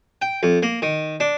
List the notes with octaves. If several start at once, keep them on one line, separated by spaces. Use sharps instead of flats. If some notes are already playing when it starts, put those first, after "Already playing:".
G5
F2
A#3
D#3
D4